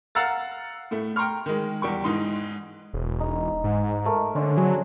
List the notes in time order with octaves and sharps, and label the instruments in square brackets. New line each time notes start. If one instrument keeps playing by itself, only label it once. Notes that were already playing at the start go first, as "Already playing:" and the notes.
[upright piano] F5 F#5 A#5 E6 A6
A2 A3
G5 A#5 C6 C#6 F6
D#3 G#3
E2 G3 G5 C#6
G#2 E3 D#4 C6
[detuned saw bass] E1
[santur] D#4
[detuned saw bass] G#2
[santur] A3 A#4
[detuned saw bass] D3 [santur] C#4 C5 D5
[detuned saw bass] F#3 [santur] G#4